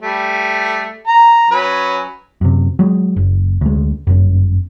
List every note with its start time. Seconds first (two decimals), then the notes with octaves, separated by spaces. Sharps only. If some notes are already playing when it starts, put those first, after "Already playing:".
0.01 G3 A3
1.07 A#5
1.51 F#3 C#4 B4
2.41 F#2 C3
2.79 F#3 G#3
3.16 F#1
3.61 D2 G#3
4.07 G1 C#2 F#2